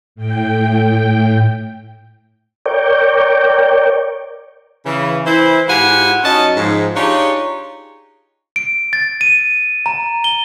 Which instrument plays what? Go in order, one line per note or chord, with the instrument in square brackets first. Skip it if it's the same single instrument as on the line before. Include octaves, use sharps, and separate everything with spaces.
[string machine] A2 G5
[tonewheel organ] A#4 C#5 D5 G5
[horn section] C#3 E3
E3 E4 C5
G#2 E4 F4 G4 F#5 G#5
F#2 F#3 C#4 D#4 D#5 A5
G#2 F3
D4 D#4 F4 G4 G#4 C#5
[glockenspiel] D7
A6
D#7
A#5
G7